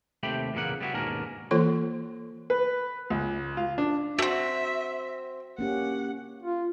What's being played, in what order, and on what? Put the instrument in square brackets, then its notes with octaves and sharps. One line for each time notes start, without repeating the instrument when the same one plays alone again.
[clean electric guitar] D#2 C3 A3 G4 G5 B5
E2 A#2 C#3 A#3 F#5
G3 B3 E4 F#4
D#2 G#2 B2 C#4 D4 A#4
[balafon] E3 A#3 F4 A4 C#5 C6
[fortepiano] B4
C#2
F4
D4
[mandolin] A3 C4 [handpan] F#4 [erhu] E5
[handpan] A#3 C#4 G4 [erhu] F#5
[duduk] F4